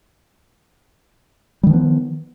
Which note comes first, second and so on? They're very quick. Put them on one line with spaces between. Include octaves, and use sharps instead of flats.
G3 D#3 F3 B3